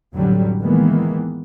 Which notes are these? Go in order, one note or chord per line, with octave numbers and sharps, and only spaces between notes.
A1 F2 D3 F#3 G3
D#3 E3 G#3 A#3 B3